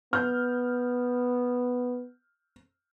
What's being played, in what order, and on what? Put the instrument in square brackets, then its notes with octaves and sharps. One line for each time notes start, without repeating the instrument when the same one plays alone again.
[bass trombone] B3 [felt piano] F6 G6